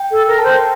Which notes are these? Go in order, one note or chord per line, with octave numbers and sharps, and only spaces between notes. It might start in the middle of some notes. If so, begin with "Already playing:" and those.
Already playing: G5
A4
A#4
A5
C5
G5